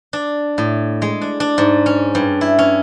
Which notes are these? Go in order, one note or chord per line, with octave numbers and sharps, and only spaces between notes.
D4
A2
G#3
D4
D4
G#2
C#4
G2
E4
C#4